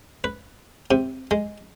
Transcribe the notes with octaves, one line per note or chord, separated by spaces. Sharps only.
B4
C3
G#3